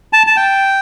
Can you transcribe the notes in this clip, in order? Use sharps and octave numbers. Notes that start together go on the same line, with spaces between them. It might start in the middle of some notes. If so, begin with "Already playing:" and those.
A5
A5
G5